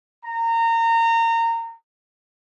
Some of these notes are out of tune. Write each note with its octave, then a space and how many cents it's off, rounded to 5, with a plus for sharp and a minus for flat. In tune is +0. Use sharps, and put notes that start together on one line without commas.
A#5 -25